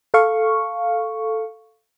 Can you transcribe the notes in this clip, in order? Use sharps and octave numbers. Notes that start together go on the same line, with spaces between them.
A4 F5 C#6